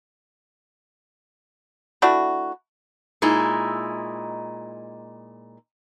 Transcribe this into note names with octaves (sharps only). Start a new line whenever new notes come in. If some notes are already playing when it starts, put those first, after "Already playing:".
A3 D4 E4 F#4
A#2 G#3 D#4 E4